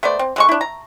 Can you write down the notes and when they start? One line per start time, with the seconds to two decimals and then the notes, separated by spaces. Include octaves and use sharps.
0.03 A3 B3 C5 D5
0.19 C4
0.36 D3 G#3 C#6
0.49 D4 E4
0.61 A#5